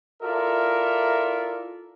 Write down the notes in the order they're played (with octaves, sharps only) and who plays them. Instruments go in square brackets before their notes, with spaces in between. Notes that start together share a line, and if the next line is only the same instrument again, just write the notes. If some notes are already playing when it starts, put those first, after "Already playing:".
[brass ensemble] E4 F4 A4 A#4 D5 E5